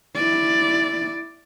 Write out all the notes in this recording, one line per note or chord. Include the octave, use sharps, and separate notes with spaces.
E4 D5